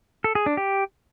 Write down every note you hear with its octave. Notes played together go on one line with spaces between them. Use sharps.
A4
G#4
D4
G4